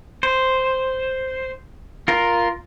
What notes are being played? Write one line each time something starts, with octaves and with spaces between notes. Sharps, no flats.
C5
F4 A#4